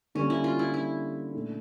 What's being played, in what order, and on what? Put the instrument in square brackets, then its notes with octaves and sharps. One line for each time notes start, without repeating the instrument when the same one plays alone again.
[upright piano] D3 G3 A#3 [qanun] C#4
[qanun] E4
F4
E4
E4
[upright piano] A#2 A3 D4